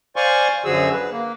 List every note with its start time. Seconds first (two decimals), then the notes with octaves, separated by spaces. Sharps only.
0.16 C5 D5 F5 G#5 C6 C#6
0.65 F#2 D3 F3 F#4 G#4 E6
0.93 B4
1.11 A#3